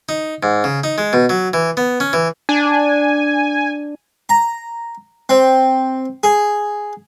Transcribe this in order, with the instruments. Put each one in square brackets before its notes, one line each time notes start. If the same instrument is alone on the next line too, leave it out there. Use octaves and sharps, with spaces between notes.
[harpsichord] D#4
G#2
C#3
D#4
G#3
B2
F#3
E3
B3
C#4
E3
[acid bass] D4 [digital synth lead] G#5
[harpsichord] A#5
C4
G#4